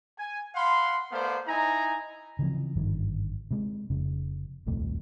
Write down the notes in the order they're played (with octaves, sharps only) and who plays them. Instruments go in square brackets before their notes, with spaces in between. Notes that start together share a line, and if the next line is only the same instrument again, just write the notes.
[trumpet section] G#5
F5 F#5 B5 C6
A3 B3 A#4 C5 D5 F5
D#4 E4 D#5 G#5 A#5
[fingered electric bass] C#3 E3 F3 C4
G#1 G2 D3 D#3
C3 G#3
F1 C#3
D#1 C2 F2 A3